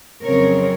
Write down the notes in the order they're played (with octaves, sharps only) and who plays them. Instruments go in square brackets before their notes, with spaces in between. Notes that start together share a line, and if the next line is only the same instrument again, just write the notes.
[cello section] F2 C#3 F#3 C4 A#4 C#5